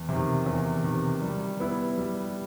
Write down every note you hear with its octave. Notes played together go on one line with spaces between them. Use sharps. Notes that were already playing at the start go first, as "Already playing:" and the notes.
Already playing: E2
C3 D#3
E2
C3 D#3
G3
B3 E4
G3